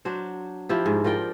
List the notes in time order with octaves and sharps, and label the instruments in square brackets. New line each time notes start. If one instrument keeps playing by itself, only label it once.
[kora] F#3 D4 C5
F3 E4 G4
G#2
F3 A#4 D5 G5